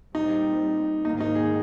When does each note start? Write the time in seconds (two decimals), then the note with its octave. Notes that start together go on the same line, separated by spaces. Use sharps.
0.14 A#2 G3 C4 D#4
1.05 G#2 D#3 A#3 D#4
1.21 D#4
1.35 G#4